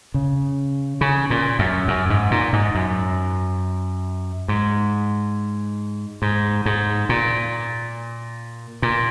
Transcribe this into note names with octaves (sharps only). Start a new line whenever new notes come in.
C#3
C#3
A#2
F#2
F#2
G#2
A#2
G#2
F#2
G#2
G#2
G#2
A#2
A#2